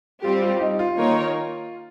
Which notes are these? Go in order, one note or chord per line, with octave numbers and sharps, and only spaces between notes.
G3 C4 F4 G4
F4
D#4
F4
D#3 A#3 D#4 A#4 C#5